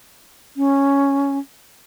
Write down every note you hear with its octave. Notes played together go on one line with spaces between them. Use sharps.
C#4